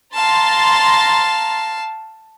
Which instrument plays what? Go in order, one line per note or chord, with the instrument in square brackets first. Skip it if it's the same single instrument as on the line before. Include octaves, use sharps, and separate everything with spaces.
[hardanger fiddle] F5 A5 [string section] A#5 C6 A6